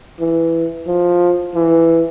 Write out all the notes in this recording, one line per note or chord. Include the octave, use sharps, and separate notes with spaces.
E3
F3
E3